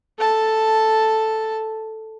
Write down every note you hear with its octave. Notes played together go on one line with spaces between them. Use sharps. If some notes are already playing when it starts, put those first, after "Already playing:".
A4 A5